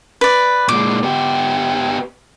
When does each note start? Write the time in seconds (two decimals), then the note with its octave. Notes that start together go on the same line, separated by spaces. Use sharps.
0.21 B4 D5
0.69 A#2 G#3 D6
1.03 B3 G4